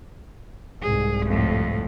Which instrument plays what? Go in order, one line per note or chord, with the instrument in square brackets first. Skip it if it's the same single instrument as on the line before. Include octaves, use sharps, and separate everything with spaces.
[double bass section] C2 G#2 [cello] G#4
[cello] F2 A2